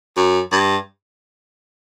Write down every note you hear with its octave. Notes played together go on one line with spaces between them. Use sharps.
F#2
G2